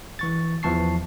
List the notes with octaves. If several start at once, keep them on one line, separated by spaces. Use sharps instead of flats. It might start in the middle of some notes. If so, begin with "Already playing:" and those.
E3 C#6 A6
E2 E3 F3 A5 C#6 C7